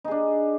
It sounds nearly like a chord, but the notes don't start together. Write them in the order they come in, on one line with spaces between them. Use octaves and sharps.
D#4 G#4 D4